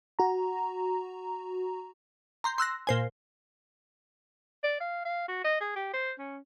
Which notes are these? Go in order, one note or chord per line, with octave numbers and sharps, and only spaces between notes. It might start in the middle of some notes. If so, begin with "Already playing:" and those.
F#4 A#5
A#5 C6 G6
C6 E6 F#6 A#6
A#2 C5 G#5
D5
F5
F5
F#4
D#5
G#4
G4
C5
C#4